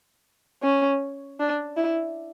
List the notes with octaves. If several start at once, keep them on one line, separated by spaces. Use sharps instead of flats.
C#4
D4
E4